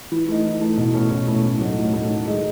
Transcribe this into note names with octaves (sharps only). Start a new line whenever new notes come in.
E3
A3 D#4
E3
A3 D#4
B2
A3 C#4 E4
B2
A3 C#4 E4
A2
F#3 A3 D#4
A2
F#3 A3 D#4
D#3
G#3 D#4